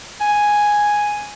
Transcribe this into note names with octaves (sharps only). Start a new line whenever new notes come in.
G#5